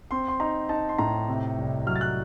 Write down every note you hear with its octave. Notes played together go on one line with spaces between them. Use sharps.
C4 C6
C6
D#4 A#5
D#4 A5
C6
A2 A#5
C3
C2
F#3 F6
A6
F#6